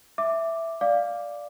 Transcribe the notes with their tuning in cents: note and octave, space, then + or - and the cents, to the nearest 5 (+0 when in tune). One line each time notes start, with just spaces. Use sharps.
E5 +0 D6 +0
D5 +0 F5 +0 D6 +0